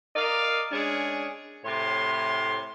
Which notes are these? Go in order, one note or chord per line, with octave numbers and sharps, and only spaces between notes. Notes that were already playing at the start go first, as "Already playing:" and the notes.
A#4 D5 D#5 F5
G#3 C#4 D4 G#4
A2 C3 C#5 C6